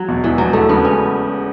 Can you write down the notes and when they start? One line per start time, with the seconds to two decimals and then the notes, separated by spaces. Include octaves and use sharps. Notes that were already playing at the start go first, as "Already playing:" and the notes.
Already playing: F#3
0.08 E2 B2
0.23 E1 E3
0.38 E2 B2 F#3
0.53 E1 A3
0.69 E2 C#3 B3
0.84 C#4